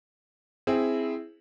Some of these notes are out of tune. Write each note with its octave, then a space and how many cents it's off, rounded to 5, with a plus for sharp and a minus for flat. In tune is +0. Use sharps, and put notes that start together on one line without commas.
C4 +0 E4 +0 G#4 +0